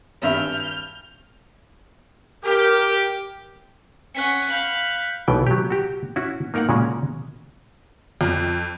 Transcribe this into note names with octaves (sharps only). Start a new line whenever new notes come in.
G#1 G2 E5 F6 G6
G4 A#4
C#4 F#5 F#6 B6 C#7
F5 B5 G6 C#7 F#7
B1 B2 E3 G5
F#3 G4
F#4 G4
C#4 E4 F#4
A#3 D#4 A#4 F5 F#5
A#2 C#3 G#3 C#4 F#4
F2